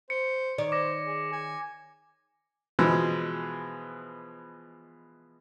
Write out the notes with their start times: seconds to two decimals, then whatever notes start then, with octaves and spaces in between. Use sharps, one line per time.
0.10 C5 C#7
0.58 D#3 C#5 D5
0.72 C5 D6 A#6
1.04 G#4
1.32 G#5
2.79 B2 E3 F3 G#3